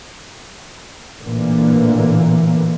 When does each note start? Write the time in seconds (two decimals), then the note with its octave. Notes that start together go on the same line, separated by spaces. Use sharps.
1.20 A1 A#2 D3 E3 A#3